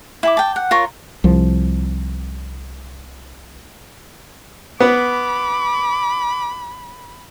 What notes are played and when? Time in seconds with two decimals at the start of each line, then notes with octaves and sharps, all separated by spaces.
0.23 E4 G#5 D6
0.37 G5 A5
0.56 F#5
0.71 F4 A#4 C#5 C#6
1.24 C2 F3
4.80 B3 B5 D6